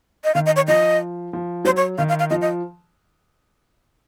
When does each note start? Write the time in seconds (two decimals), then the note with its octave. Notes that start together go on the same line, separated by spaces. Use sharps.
0.24 D#5
0.34 D#3 F5
0.46 D#5
0.56 C#5
0.67 F3 D#5
1.33 F3
1.65 F#3 C5
1.77 C#5
1.98 D#3 F5
2.09 F5
2.19 F5
2.30 F3 D#5
2.41 D#5